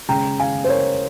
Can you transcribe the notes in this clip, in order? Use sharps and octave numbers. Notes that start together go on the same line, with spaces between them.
C#3 G#3 C#4 G5 A#5
F5 G#5
C5
A#4 C#5